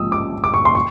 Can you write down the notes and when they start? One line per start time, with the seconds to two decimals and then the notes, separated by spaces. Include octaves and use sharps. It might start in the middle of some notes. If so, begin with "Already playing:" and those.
Already playing: A#1 G#2 F3 A#3 D#6 E6
0.12 D6
0.44 D6
0.54 C#6
0.65 C6
0.75 C#6